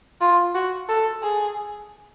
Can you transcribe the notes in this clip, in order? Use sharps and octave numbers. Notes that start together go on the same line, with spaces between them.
F4
F#4
A4
G#4